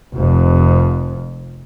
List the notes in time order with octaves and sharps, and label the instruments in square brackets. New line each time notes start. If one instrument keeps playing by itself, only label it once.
[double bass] F1 F2